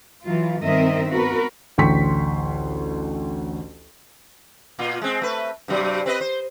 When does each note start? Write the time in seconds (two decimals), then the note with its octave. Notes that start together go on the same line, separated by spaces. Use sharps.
0.24 E3 F#3 F4
0.62 G2 D#3 C4 A#4 D#5 E5
1.10 B3 F#4 A#4 B4
1.78 A1 D2 G5 C6 C#6 B6
4.79 A#2 F4
5.01 G#3 C4
5.22 A3 B4
5.68 G2 C3 F#3
6.06 C4 B4 D#5
6.21 C5